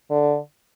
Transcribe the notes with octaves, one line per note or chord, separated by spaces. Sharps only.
D3